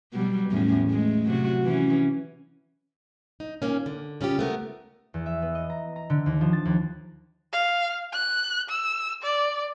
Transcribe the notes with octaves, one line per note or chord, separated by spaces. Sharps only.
B2 F#3 G3
E2 A2 C#4
G#3 A3
C3 F#3 F#4
E3 C#4
D#4
A#2 D#3 A#3 C#4
D3
C#3 C#4 F4 G4
A3 B3 A#4
E2
E5
B3
D#5
A#5
A#5
D3
D#2
F3
A6
D#2
F5
F#6
E6
D5